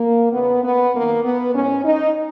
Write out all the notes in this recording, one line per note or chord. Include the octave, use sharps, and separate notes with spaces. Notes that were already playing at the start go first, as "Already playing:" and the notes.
Already playing: A#3
E2 C#3 E3 B3
B3
F#2 D#3 A#3
B3
G#2 E3 C#4
D#4